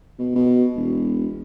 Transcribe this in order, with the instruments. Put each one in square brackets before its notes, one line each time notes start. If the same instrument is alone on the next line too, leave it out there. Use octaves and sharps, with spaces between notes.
[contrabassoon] B2
B2
E1